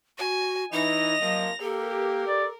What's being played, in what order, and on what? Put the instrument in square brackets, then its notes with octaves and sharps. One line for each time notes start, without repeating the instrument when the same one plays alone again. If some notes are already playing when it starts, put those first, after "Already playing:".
[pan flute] F#4 [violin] G#5
[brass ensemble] E3 [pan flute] D#4 [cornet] D#5 [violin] A#6 F7
[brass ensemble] C3 F3 A#3 [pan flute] F#3
[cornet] A#3 [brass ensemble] G4 [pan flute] A4 [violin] A#4
[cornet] D5